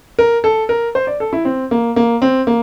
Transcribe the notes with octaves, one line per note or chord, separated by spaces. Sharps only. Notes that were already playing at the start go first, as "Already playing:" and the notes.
A#4
A4
A#4
C5
D5
A4
E4
C4
A#3
A#3
C4
A#3